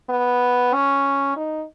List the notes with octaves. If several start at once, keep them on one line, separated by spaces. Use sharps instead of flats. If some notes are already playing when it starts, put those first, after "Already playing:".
B3
C#4
D#4